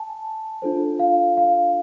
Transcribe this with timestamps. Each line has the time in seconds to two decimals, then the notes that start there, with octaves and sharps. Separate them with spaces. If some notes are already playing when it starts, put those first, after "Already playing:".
Already playing: G#5 A5
0.62 D4 F4 A4 C5
0.99 F5
1.37 F5